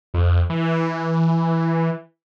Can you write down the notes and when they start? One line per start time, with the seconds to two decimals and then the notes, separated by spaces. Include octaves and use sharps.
0.14 F2
0.50 E3